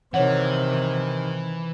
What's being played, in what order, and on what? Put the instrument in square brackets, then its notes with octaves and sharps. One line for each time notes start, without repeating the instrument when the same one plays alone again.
[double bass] C3 D#3 [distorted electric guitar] E3 [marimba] C#5 F#5